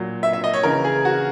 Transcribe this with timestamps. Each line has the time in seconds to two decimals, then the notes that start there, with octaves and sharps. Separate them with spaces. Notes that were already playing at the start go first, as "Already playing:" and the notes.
Already playing: A#2 F#3
0.23 E5
0.33 E5
0.44 D#5
0.54 C#5
0.63 C#3 E3 A#4
0.84 G#4
1.05 F#4